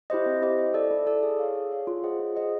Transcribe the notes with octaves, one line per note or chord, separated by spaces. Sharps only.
E4 G4 C5 D#5
C4
E4 G4 C5 D#5
E4
A4 D5
E4
A4 D5
G#4
C#5 F5
G#4
C#5 F5
F4
G#4 C5 D#5 F#5
F4
G#4 C5 D#5 F#5